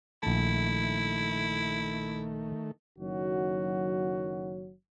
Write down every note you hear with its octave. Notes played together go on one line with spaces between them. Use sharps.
A#1 D#3 A3 E4 A5
F#1 D#3 F#3 F#4